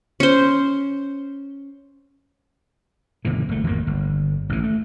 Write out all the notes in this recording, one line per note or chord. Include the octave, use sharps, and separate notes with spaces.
C#4 C5
F#1 A#2 D3 E3
G1 A3
G#1 F2 A2 A#3
G1
A1 E3
A3